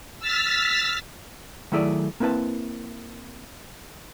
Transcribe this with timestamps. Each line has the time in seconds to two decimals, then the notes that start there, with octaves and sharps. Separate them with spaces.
0.19 E6 F6 A6 B6
1.72 D#3 F#3 A3 E4 G#4 D5
2.20 A#3 C4 E4 B4 A5